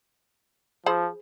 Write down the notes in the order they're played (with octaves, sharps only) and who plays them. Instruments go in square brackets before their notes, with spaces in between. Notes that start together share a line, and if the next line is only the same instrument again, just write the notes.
[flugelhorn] F3 [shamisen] G#4 C5 B5